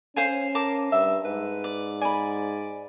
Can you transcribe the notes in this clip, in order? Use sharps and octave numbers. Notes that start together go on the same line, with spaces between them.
C#4 C5 F5 G#5
A#4 A5 D6
G2 E5
G#2 B4
D5
D5 G#5 B5